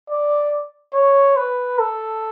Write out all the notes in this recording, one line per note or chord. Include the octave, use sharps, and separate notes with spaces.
D5
C#5
B4
A4